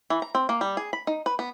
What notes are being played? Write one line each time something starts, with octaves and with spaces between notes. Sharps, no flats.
E3
A#5
C4
A#3
G3
G#4
B5
D#4
B4
B3